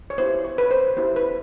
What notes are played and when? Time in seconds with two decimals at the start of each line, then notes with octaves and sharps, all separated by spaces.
0.10 C#5
0.18 B3 E4 G4 C5
0.44 C#5
0.58 B4
0.71 C5
0.97 B3 E4 G4 C5
1.16 B4